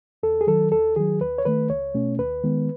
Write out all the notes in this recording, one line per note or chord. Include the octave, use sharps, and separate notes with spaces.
E2 A4
G#4
D#3 F#3 A4
D#2 A4
D#3 F#3 G#4
D#2 B4
C#5
D#3 A3 B4
C#2 C#5
B2 A3 C#4
D#2 B4
D#3 G#3 B3